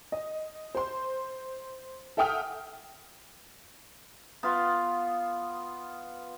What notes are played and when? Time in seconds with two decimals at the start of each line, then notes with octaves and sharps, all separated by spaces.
0.12 D#5
0.75 C5 C6
2.17 A4 E5 F#5 G5 D#6 F6
4.43 B3 F4